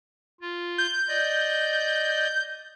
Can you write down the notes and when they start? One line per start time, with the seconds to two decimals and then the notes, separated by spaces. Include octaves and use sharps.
0.41 F4
0.78 G6
1.08 D5 D#5